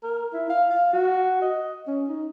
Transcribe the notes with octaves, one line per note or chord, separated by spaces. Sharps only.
A#4
E4
F5
F5
F#4
D#5
C#4
D#4